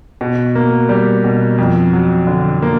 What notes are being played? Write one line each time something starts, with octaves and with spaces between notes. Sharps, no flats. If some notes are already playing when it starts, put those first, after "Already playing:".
B2
A#3
G3
B2
F2
F#3
D3
A#3